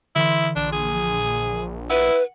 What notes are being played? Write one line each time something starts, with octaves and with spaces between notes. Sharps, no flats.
D3 E3 E4 C6
A#1 D4
G#4
E4 B4 F#5